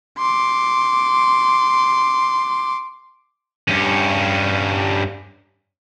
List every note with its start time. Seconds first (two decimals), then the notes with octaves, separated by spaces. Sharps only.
0.18 C6 D6
3.68 G2 C#4